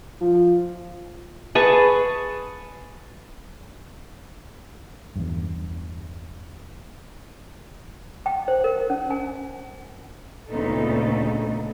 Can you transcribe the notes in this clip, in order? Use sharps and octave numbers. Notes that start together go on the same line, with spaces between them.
F3
G#4 B4 A5 C#6
E2 G2
G5
C5
A#4
C#4
G#5
D2 A#2 C#3 B3 D#4 A4